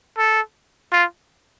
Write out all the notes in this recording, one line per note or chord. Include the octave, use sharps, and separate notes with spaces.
A4
F4